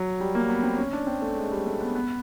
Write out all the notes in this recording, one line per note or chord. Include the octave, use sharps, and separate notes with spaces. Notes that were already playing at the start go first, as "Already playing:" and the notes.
Already playing: F#3
G3
A#3
B3
C4
C#4
D4
C4
A3
G#3
G3
A3
B3
B3